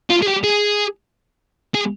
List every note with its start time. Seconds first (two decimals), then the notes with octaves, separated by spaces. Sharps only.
0.10 F4
0.23 G#4
0.28 G4
0.44 G#4
1.75 G#4